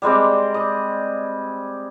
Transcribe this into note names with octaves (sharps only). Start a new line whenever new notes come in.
G3 G#3 C4 D5
D#5